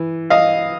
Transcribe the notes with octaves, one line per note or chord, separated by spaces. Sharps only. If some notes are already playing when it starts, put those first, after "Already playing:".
Already playing: E3
D#5 F5